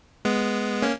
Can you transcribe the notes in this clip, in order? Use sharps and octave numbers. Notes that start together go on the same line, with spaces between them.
G#3 B3
A#3 C#4